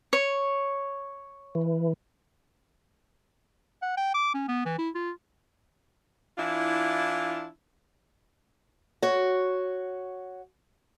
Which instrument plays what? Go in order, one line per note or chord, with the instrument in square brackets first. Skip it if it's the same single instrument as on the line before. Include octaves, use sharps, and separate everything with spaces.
[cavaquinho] C#5
[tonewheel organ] E3
[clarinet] F#5
G5
D6
C#4
B3
E3
E4
F4
[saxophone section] E3 D4 E4 F4
[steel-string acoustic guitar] F#4 C#5